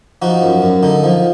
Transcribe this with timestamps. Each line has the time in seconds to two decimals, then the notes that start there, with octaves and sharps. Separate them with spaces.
0.22 F3 D#4 F#4
0.42 F#2
0.62 F#2
0.83 D3 D#4
1.04 F3